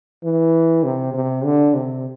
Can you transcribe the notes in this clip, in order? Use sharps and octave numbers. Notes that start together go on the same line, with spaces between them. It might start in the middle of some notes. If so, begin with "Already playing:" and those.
E3
C3
C3
D3
C3